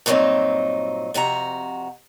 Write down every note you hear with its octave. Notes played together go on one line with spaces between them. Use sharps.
G2 A#2 F#3 G3 C4 D#4
F2 C3 F#4 A#5